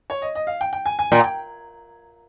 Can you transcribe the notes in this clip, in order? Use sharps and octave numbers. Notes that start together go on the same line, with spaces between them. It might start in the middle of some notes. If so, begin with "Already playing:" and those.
C#5
D#5
D#5
F5
G5
G5
G#5
G#5
A#2 G5
G5